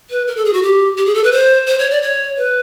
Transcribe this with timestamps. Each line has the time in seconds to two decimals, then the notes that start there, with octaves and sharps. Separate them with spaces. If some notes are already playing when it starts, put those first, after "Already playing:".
0.10 B4
0.27 A#4
0.36 A4
0.45 G#4
0.53 F#4
0.63 G4
0.98 G4
1.06 G#4
1.15 A4
1.24 B4
1.32 C5
1.67 C5
1.79 C#5
1.91 D5
2.02 C#5
2.37 B4